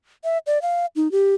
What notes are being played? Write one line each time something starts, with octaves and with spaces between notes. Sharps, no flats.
E5
D5
F5
D#4
G4